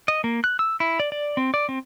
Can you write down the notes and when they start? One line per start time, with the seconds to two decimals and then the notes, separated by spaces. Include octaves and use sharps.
0.08 D#5
0.24 A#3
0.44 F#6
0.59 E6
0.80 E4
1.00 D5
1.12 D5
1.37 C4
1.54 D5
1.69 C4